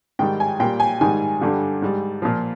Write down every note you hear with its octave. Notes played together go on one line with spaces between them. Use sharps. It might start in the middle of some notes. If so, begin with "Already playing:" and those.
G#2 D#3 G3 G5
G#5
A#2 G3 G5
G#5
G#2 D#3 G3 G#5
G2 D3 G3
G#2 G3
A#2 F3